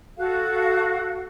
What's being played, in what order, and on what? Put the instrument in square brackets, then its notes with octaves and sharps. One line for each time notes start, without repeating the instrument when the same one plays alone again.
[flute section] F#4 A4 F5